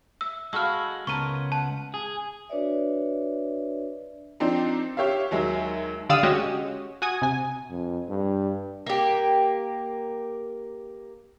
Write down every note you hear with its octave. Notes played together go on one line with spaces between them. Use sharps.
E5 E6
G#3 F#4 A4 B4 F5 E6 F6
C#2 B3 A4 A#4 C#5 C#6 D#7
F#5 A5
G#4
D4 F#4 B4 C#5 D5 E5
F3 C4 D4 D#4
G4 C#5 E5 F5
D#2 F#3 G#3 E5
D3 G4 D5 F5 D#6 E6
G#3 C#4 F#4 G4 C#5 D#5
F#4 G#5 D#6
C3 G#5
F2
G2
A#3 G4